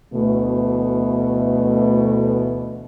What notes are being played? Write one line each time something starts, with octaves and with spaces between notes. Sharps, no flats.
D2 B2 E3 A3